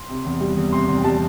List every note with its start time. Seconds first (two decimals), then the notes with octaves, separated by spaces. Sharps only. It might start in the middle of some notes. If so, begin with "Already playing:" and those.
Already playing: C6
0.10 C3
0.25 E2
0.40 G3
0.57 E2
0.72 C3 C6
0.88 E2
0.98 G5
1.04 G3 A5